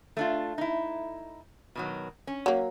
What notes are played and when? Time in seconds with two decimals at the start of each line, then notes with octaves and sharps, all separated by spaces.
0.17 A3 D4 F4
0.58 D#4 E4
1.75 B2 D#3 F#3
2.27 C#4
2.46 F#3 A#3